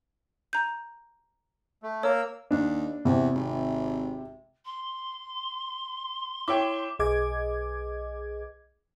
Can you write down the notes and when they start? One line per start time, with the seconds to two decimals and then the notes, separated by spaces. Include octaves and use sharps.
0.53 A#5 G6
1.83 A3
2.03 A#3 A#4 C#5 E6
2.51 D#2 D4
3.05 E2 C3
3.35 G#1
4.65 C6
6.48 E4 C#5 G5 D6
6.99 B1 G#4 D#5 D6 G#6